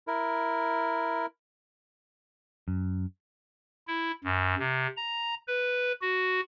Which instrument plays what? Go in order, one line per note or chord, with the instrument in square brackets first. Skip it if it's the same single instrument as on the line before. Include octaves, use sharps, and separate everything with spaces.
[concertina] E4 A#4
[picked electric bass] F#2
[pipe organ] E4
F#2
C3
A#5
B4
F#4